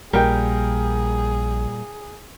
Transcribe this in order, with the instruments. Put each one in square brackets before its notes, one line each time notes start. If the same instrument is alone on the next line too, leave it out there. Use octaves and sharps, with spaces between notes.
[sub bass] A#1 [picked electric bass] A#2 G3 [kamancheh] G#4 [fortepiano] A#4 G5